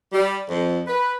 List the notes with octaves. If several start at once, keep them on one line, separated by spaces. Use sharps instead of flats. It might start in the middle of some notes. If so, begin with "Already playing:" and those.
G3
F2
B4